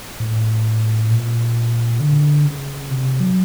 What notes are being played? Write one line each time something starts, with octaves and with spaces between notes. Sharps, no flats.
A2
A#2
D3
C#3
C3
F#3